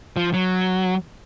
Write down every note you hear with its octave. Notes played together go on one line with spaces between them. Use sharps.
F3
F#3